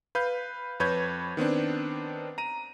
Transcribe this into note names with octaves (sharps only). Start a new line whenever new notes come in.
B4 F5 G6
F2 B4 C#5 G6 G#6
D#3 B3 C4 D4
A#5 D#7